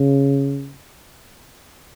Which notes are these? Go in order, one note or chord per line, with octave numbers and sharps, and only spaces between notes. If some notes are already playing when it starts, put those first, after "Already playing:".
Already playing: C#3